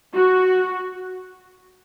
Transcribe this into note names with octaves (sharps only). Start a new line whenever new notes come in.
F#4